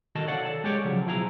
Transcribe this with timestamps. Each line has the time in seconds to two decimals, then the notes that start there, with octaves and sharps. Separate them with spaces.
0.15 C3 D#3 F#4 A4 D#5 A5
0.27 A4 C#5 D5 F5 F#5
0.45 A4 A5
0.64 G#3 G4 C#5 D5
0.84 C#3 F3 F#3
1.06 B1 F3 E4 G#4 A#5